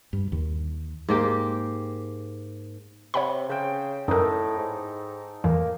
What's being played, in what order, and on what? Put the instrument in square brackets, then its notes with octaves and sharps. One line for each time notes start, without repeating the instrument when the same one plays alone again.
[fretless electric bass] G2
D#2
[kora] G#2 A#3 G4
[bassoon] C3 [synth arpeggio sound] C#5 F#5 B5
[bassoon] C#3 [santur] C5 G5
[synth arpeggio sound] F#2 A#4 [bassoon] A2 [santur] D#4 A4
[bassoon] G#2
[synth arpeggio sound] F2 A2 E3 [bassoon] A#3